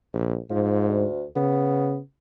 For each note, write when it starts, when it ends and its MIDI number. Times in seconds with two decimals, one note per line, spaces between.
0.13 0.37 34
0.50 1.05 44
0.50 0.87 53
0.88 1.23 38
1.36 1.98 49
1.36 1.98 59